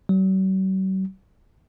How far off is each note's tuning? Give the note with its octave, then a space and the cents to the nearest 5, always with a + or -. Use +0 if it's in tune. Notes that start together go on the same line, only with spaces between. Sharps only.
F#3 +45